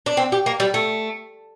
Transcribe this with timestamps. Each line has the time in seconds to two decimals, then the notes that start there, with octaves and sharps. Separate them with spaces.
0.06 D4
0.17 C4
0.32 G4
0.46 A#3
0.60 G3
0.74 A3